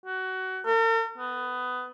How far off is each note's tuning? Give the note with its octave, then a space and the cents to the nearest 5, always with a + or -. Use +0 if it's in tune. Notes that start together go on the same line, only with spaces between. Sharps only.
F#4 +20
A#4 -45
B3 +15